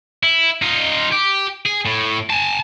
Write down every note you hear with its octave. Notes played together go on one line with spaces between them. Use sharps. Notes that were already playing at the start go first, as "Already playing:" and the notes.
E4
D#4 F4
G4
G#4
A2
G#5 A5